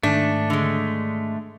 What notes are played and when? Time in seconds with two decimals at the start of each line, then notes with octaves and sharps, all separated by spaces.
0.03 G#2 D#3 A3 D4
0.50 D3 G#3